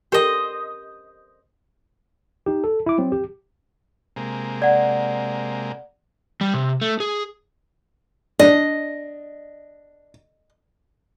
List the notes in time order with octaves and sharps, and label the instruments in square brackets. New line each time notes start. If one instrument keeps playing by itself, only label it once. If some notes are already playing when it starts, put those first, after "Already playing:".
[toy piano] C#4 G4 A#4 [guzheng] C5 D#5
[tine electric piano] D#4 G4
A4
E4 D6
F#3 C4
G4
[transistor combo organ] C3 G#3 A#3
[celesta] D5 F#5
[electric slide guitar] G3
C3
A3
G#4
[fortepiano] D4 [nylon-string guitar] D#5